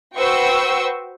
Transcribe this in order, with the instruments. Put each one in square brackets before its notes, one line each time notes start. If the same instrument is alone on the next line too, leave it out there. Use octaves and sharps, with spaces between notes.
[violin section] F#4 B4 C5 G5 C#6 E6